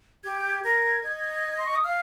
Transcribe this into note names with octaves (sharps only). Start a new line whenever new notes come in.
G4 G#6
G6
G#6
A#4
D#5
C6
C#6
D#6
F5 F6